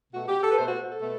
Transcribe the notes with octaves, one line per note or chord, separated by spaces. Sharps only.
B2 A3 F#4
G4
A4
B4
B2 A3 C5
F#4
A4
B2 A3